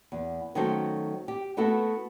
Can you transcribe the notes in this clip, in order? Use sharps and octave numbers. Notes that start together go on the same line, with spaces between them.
E2
D#3 F#3 A3 C#4 A4 C5
G4
A3 B3 E4 F#4 A4